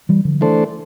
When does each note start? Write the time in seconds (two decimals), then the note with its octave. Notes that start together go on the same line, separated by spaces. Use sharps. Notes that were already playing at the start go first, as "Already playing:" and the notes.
0.09 E3 G3
0.25 D3 F3
0.41 E3 A3 D4 A4 C5